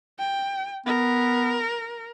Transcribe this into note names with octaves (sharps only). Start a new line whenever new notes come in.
G5
B3 A#4